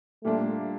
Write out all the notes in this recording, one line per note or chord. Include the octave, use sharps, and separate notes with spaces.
A#2 G3 A3 A#3 D4 F4